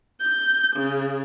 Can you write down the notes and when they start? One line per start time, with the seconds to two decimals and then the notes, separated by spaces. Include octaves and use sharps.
0.20 G6
0.76 C#3